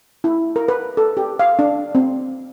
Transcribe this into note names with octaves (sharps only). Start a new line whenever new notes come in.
E4
A#4
B4
A4
G4
F5
D4
C4